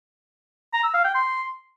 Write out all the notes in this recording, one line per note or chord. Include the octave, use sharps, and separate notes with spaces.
A#5
E6
F5
G5
C6